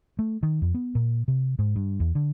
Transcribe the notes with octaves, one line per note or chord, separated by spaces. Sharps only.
A3
D#3
F2
B3
A#2
C3
G#2
G2
E2
D3